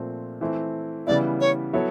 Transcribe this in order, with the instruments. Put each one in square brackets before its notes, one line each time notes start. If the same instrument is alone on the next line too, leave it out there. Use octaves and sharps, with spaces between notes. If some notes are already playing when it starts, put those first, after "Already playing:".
Already playing: [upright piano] A#2 F3 A3 C4
E3 A3 C4 E4
[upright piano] C#3 E3 G3 B3 E4 [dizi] D5
[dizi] C#5
[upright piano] F#3 B3 E4 A4 C#5